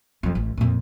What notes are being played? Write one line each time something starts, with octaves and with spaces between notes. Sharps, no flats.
F2 G3
A1
F2 A#2